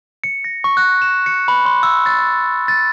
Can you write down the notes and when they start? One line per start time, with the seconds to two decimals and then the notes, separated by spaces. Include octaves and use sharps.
0.24 C#7
0.44 A#6
0.64 C#6
0.77 F#6
1.02 E7
1.26 C#7
1.48 B5
1.65 C6
1.83 E6
2.06 A6
2.68 A6